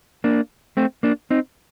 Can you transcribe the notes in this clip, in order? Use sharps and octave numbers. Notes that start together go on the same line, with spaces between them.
A#3 D4
A3 C4
A#3 D4
C4 D#4